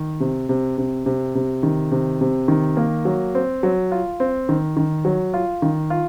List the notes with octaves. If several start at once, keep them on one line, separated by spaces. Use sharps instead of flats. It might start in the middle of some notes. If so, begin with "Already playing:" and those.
Already playing: D#3
C3
C3
C3
C3
C3
D#3
C3
C3
D#3
A#3
F#3
C4
F#3
F4
C4
D#3
D#3
F#3
F4
D#3
F4